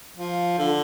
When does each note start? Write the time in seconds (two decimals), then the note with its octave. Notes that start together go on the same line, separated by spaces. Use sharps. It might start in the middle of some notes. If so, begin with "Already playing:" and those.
0.17 F3
0.58 D3